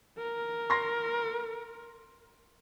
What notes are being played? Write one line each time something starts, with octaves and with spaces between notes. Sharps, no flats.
A#4
C6 A#6